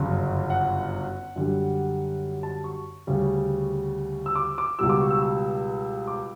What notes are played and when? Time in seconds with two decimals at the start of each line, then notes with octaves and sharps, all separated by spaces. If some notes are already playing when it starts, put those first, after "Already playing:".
Already playing: G1 F#2 C#3 F#3
0.50 F#5
1.36 F#2 D3 G3
2.43 A5
2.64 C#6
3.07 D2 C#3 G3
4.26 E6
4.36 D6
4.58 D6
4.79 C#2 B2 G3 E6
4.89 D6
5.01 C#6
5.11 E6
5.22 E6
6.07 D6